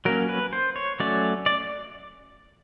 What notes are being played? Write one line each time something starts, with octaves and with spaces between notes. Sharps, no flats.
F#3 A#3 C#4 A#4
B4
C5
C#5
F#3 A3 C#4 D5
D5